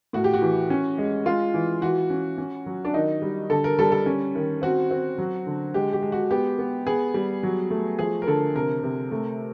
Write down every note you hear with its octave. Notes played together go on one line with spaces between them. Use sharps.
A2 F#4
G4
F#4
E3
C#4
G#3
G#3 F4
E3
E3 F#4
C#4
C#4
F#3
D4
D#3 D#4
G3
D3 A4
A#4
G3 A4
A4
C#4
D#3
C4 F#4
C4
F#3
D3
G#3 G4
G4
G#3
F#4
B3 G4
B3
B3 G#4
G3
F#3
A3
F3 G#4
A#4
D3 A4
C3 A#4
C3
A3